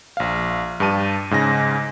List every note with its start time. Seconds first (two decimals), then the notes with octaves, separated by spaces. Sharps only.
0.17 A#1 F5
0.80 G2 G4 A5 D#7
1.31 G#2 C#3 G#5 A#6